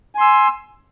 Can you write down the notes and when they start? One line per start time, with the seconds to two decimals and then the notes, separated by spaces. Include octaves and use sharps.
0.15 G#5
0.18 C6
0.21 E6